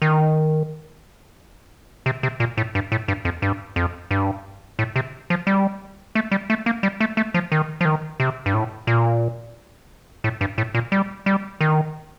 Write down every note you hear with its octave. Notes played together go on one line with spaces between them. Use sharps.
D#3
C3
C3
A#2
A2
G2
A2
G2
F2
G2
F2
G2
A2
C3
F3
G3
A3
G3
A3
A#3
G3
A3
A3
F3
D#3
F3
D#3
C3
G2
A2
A#2
A2
G2
A2
A#2
G3
G3
D#3